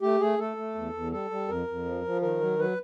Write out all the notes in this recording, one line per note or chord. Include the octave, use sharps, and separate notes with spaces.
A3 G4
A3 G#4
A3 A4
A3
E2
E2
G3 A4
G3
F2 A#4
F2
F3
F3
D#3 A#4
F#3
F#3 B4